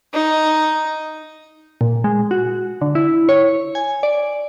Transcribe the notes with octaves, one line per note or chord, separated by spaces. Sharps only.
D#4
A#2
G#3
F#4
D3
E4
C#5
G#5
D5